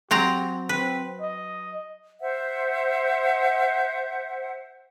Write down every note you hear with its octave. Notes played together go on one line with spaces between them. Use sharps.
F#3 C4 G4 A#5
C4 B4
D#5
C5 E5 F#5